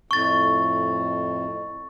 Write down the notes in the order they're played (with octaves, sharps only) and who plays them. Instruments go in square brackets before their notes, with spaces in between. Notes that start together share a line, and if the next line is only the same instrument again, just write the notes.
[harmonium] F2 A2 [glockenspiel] C#6 A6